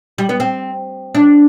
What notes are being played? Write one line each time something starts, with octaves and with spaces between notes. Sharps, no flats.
G3
B3
C4
D4